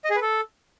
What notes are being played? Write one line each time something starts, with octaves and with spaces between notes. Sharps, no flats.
D#5
G#4
B4
A4